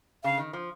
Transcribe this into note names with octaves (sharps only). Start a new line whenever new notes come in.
C#3 F5
D#3
F3